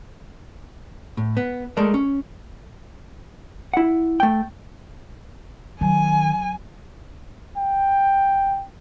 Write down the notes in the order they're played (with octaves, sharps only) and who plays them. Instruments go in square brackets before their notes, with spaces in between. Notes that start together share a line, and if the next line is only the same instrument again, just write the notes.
[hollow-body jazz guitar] A2
B3
G#3 A3 A4 A#4 D5
C#4
E4 F#5
A3 G5
[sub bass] D#3 [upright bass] F#3 [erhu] G#5
[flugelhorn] G5